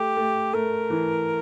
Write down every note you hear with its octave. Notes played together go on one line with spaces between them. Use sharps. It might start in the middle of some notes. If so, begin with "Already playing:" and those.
Already playing: A3 G4
A3
A3 A#4
E3